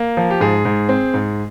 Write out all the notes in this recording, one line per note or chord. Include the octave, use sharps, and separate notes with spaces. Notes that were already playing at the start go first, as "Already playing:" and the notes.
Already playing: A#3
F3
G4
G#2 G#4
G#2
C4
G#2